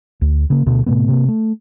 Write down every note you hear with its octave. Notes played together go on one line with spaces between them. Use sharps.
D2
C#3 A#3
D2 B2
A2 C3 A3 B3
C3 A#3
A3